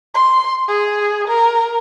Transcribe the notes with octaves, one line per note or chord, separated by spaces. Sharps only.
C6
G#4
A#4